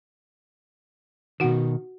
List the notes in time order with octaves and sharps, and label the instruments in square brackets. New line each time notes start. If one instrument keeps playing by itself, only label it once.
[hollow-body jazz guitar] B2 D#3 [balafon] F#4 F#5